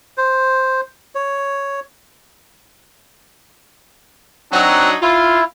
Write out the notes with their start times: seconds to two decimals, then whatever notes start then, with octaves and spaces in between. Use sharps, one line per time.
0.17 C5
1.15 C#5
4.52 F#3 C4 D4 D#4 F#4
5.02 E4 F4